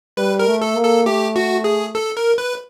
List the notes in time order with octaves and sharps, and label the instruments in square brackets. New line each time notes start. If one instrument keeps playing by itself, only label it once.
[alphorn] G3 [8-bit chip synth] B4
[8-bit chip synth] A#4
[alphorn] A3
[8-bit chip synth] A4
[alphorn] A#3
[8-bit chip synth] A4
[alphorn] A3 [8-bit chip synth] G4
[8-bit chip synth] F#4
G#4
A4
A#4
B4